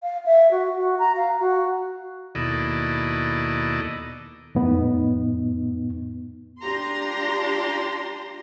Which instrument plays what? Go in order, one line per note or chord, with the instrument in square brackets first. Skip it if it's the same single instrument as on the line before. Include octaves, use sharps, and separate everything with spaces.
[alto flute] F5
E5
F#4
F#4
A#5
F5
F#4
[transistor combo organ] D#2 B2 E4 A4 D5 D#5
[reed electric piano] F2 A2 B3 D#4
[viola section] D4 F4 G4 A#5 C6